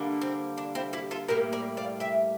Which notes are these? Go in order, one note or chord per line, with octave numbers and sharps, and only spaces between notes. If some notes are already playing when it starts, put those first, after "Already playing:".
Already playing: D3 G3 A#3
C4
D4
C4 E4
E4 G4
F4 A4
A2 G3 A#3 G4 A#4
A#4 D5
D5 F5
E5 G5